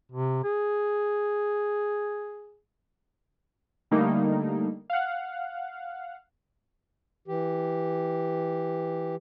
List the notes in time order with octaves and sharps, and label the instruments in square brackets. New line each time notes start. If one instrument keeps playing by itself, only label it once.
[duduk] C3
G#4
[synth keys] D3 G3 A3 A#3 D#4
F5 F#5
[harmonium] E3 G4